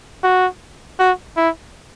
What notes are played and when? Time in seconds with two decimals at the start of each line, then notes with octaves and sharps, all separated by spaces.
0.24 F#4
0.99 F#4
1.37 E4